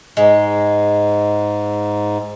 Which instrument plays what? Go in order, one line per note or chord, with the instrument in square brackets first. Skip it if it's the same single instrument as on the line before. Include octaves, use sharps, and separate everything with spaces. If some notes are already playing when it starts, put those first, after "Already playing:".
[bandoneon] G#2 [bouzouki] G#3